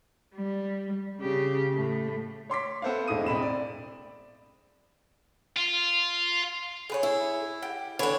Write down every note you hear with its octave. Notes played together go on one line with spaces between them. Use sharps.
G3
C#3 G4
A2 A3
C#5 C6 D6 B6
B3 A4 C5 E5 F5
E1 B1 A2 E4 D#6 D#7
E1 C4 B5 E7
D5
F4
G#4 B4 C#5
E4
G4
D3 E3 D4 C#5